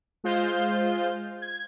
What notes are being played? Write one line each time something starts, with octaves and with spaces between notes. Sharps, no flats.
G#3 F4 C5 G6
G#6